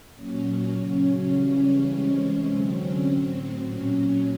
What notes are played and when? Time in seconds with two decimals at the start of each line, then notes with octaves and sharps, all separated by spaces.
0.14 A#2 F#3 C#4
0.73 C#3 F#3 C#4
1.03 C#4
1.32 C#3 E3 G3
1.61 C#4
1.90 C3 E3 G#3
2.49 D3 F#3 C4
2.78 C#4
3.08 A2 F#3 C4
3.66 A#2 F#3 C#4
3.96 C#4